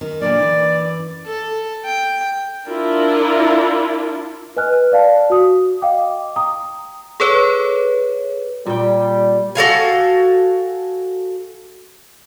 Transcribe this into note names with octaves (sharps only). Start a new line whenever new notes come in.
F#2 D#3
A#2 D3 A#3 D5
E3
A4
G5
D4 E4 F4 A#4
B4 D#5 G#5 F6 F#6
D5 F5 A5
F#4 D#6
D#5 F5 G5 D6
G5 A#5 D#6
G#4 A4 B4 C#5
A#2 G3 G5
F#4 A4 F5 G#5